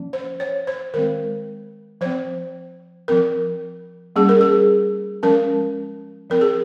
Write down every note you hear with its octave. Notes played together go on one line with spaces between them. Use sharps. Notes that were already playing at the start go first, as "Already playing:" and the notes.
Already playing: F3 A#3 C#4
C5
C#5
C5
D#3 G#3 C4 A#4
F3 C4 C5
F3 C4 A#4
G3 A#3 C#4 G#4
A#4
G#4
F3 G#3 C#4 A#4
F3 C4 A#4
G#4